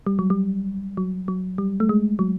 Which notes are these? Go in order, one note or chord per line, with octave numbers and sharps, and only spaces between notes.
G3
F#3
G3
F#3
F#3
G3
A3
G#3
F#3